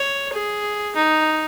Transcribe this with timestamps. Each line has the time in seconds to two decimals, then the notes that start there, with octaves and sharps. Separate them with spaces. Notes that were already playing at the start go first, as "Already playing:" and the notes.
Already playing: C#5
0.34 G#4
0.96 D#4